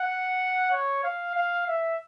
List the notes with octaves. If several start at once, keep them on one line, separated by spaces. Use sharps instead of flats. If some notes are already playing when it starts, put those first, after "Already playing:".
Already playing: F#5
C#5
F5
F5
E5